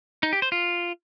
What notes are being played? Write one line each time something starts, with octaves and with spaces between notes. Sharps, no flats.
D#4
G4
C5
F4